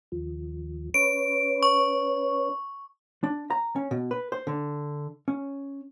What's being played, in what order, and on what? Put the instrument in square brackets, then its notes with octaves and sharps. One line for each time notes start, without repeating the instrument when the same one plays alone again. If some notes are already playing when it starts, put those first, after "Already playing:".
[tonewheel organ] D#2 F3
[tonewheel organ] C#4 B4 C#5 [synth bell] D7
[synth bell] C#6
[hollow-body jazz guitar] D4
A#5
C#4
B2
B4
C5
D3
C#4